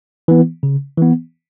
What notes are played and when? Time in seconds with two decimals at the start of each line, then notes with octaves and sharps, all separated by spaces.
0.28 E3 B3
0.63 C#3
0.97 E3 B3